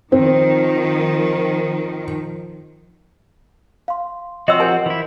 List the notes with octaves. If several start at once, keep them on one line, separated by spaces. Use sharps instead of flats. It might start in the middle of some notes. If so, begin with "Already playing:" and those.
D#3 F3 C4
F5 C6
F3 C4 F#4 C#5 D#5 C6 E6
G4 A#4 C5 F#5 G#5 G6
E3 E4